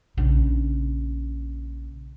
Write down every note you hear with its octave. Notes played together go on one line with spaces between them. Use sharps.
A#1 C#3